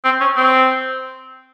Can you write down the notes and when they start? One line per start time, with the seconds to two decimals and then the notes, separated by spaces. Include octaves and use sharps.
0.04 C4
0.20 C#4
0.36 C4